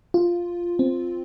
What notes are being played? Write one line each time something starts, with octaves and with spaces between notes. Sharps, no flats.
F4
C4